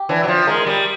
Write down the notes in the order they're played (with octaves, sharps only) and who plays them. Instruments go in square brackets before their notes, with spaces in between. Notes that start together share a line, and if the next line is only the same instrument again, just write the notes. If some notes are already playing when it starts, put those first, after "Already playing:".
Already playing: [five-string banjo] G4
[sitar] E3 [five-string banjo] D4
[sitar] F#3
F3
[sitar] G#3 [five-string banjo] A#4
[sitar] G3